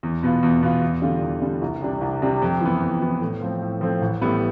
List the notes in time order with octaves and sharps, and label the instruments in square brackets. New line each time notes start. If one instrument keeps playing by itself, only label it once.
[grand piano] E2
B2 B3 F4
E2
B2 B3 F4
E2
D3 G3 D4 F4
E2
D3 G3 D4 F4
C2
C3 G3 D4
C2
C3 G3 D4
F2
E3 B3
F2
E3 B3
A2
F3 A3 C4
A2
F3 A3 C4
A1
A2 G3 B3 E4